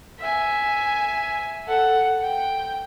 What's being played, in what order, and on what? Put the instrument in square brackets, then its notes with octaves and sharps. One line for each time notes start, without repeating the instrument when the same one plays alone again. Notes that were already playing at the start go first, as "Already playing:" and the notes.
[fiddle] E5 G#5
A4 F#5
G5